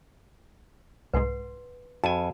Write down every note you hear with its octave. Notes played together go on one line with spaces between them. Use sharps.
C2 G#2 B4 F#5 C6
F2 F#4 G#5 A5 B5